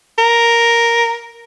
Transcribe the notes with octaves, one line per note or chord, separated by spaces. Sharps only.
A#4